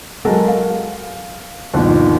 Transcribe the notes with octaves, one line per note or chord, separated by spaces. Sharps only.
F#3 G#3 A4 A#4
F5
G1 D#2 B2 F3